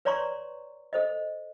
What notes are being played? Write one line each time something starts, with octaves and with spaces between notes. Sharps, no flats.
B4 C#5 D5 A#5 C6 C#6
A4 C5 D#5